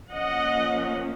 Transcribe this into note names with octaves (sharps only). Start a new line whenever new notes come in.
F3 A#3 C#4 D#5 F#5